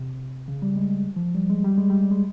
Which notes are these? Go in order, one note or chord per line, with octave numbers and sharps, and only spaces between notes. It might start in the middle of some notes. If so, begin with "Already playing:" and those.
Already playing: C3
C#3
G3
G#3
F3
G3
G#3
G3
G#3
G3
G#3